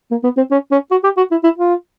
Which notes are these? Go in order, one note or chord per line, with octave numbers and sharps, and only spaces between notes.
A#3
B3
C4
C#4
C#4
F#4
G4
F#4
E4
E4
F4